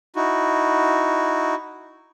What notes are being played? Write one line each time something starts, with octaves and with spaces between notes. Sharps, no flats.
D#4 E4 F#4